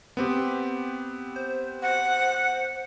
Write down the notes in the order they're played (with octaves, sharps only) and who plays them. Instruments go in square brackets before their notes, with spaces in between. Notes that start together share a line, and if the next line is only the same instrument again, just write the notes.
[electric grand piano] B3 C4 G4
[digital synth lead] C5
[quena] F#5